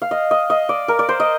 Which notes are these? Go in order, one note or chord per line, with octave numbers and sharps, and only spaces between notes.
F5
D#5
D#5
D#5
D5
A#4
D5
C5
D#5